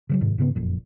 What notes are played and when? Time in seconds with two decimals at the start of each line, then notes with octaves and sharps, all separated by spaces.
0.09 C#3 F3 F#3
0.21 F#1 G#2 C3 D#3
0.38 G#2 C#3 A#3 B3
0.55 F#1 F2 A#2